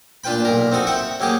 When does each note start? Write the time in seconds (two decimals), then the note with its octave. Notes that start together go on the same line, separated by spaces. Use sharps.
0.24 A#2 D4 F4 B4 G5 B5
0.45 B1 A#2 A#4
0.72 C4 D#4 F#4 A4
0.87 E5 F#5 G5 C#6
1.20 F#3 A#3 G4 G#4